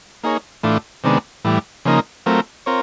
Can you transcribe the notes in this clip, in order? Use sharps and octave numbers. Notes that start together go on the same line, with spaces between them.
A#3 D#4 G#4 C#5
A2 E3 A3 D4 F4
C3 D#3 G#3 B3 D4
A2 E3 G3
C#3 F3 A#3 D#4
F#3 A3 C4 F4 A#4
C4 F4 A#4 C#5